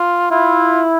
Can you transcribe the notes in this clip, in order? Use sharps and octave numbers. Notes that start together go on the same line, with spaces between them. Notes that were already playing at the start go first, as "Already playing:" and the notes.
Already playing: F4
E4 F4